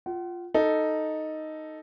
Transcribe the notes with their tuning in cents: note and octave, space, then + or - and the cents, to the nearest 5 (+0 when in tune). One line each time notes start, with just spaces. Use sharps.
F4 +0 F#5 +40
D#4 +0 A4 +0